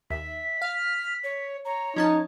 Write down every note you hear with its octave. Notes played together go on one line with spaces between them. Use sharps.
D#2 E5 B6
F5 F6
C#5
C#5 A#5
F3 C#4 D#4 A5 G#6